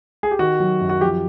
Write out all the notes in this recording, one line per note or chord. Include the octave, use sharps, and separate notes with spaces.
G#4
G4
D#3 F#4
F#3
F#2
F#4
F3 G4